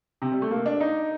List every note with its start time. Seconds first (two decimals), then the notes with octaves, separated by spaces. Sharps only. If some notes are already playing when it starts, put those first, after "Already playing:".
0.22 C3
0.32 G3
0.42 A3
0.51 A#3
0.66 D4
0.80 D#4